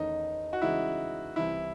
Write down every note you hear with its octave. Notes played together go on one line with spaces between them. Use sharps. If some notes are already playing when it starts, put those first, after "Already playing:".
Already playing: E2 D#3 A3 C#4 D#4
F#4
C#3 E3 G#3 D#4 E4 G#4
C2 C3 E3 E4